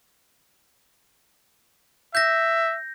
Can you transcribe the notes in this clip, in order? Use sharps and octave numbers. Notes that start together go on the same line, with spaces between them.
E5 G6 A#6